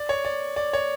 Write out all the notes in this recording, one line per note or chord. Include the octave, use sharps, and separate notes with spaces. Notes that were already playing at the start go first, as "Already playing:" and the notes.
Already playing: D5
C#5
D5
D5
C#5